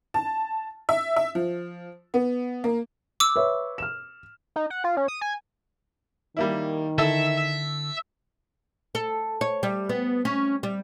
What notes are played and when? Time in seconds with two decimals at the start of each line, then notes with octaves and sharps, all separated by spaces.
0.14 A5
0.89 E5
1.16 E5
1.35 F3
2.14 B3
2.64 A#3
3.20 D6 E6
3.36 B4 C#5 E5
3.78 F6 E7
4.56 D#4
4.70 F#5
4.84 F4
4.97 C#4
5.08 D#6
5.21 G#5
6.37 D#3 G3 A#3 E4
6.98 D3 E4 A4 E5
8.95 A4
9.41 C#5
9.63 G3
9.89 B3
10.25 C#4
10.63 G3